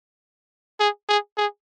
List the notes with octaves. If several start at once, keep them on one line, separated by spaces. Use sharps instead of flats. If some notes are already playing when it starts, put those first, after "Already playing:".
G#4
G#4
G#4